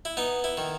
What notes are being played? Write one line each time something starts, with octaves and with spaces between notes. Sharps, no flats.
E4
B3 D#4
E4
D#3